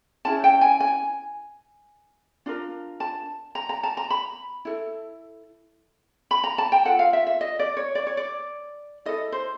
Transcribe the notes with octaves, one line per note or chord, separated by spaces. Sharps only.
C#4 E4 G#4 A5
G5
G#5
G#5
D4 F4 A#4
A5
A#5
A#5
A5
A#5
B5
E4 A4
B5
A#5
A5
G5
F4 A4 F#5
F5
E5
E5
D#5
D5
C#5
D5
C#5
D5
E4 A4 D#5
C5